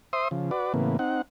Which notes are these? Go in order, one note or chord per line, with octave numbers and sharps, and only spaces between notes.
C5 E5 C6 D#6
C#3 F3
F#4 B4 D5
A2 C#3 E3 A#3 B3
C4 D#4 F#5